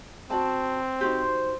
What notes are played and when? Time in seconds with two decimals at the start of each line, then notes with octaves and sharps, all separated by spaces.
0.30 C4 F#4 D5 A5
1.01 D#4 F#4 G4 C5